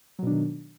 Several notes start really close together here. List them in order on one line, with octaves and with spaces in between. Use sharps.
F#3 B2 D4 D#3